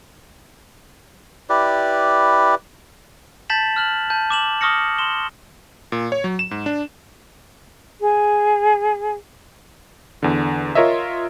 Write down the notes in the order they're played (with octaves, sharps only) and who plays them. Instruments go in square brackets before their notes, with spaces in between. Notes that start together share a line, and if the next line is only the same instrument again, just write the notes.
[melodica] E4 G4 B4 D5
[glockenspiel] A5 G6 A6 B6 E7 F#7
F6 F#6 F#7
A5 G6
D6 E7 F#7
C#6 D#6 F6 A#6 C#7
C6 E7 G7
[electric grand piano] A#2
C#5
F#3
E7
G#2
D4
[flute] G#4
[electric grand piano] E2 D3
F4 A#4 C#5 D#5 E5